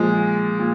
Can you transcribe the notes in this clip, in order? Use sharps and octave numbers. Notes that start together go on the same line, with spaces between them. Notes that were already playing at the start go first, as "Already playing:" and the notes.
Already playing: A#2 F3 G#3
A#2